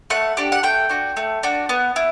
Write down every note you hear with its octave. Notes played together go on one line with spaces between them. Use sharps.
A3 F#5
D4 G4
F#5
A3 G5
D4 F#4
A3
D4 F#4
B3
E4